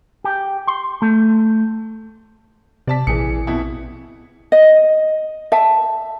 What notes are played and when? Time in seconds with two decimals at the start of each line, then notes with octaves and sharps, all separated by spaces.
0.24 G4
0.67 C6
1.02 A3
2.88 C3 D5 A5 B6
3.07 A#1 E3 G#4 C#7
3.47 F2 B2 E4
4.52 D#5
5.52 E5 A5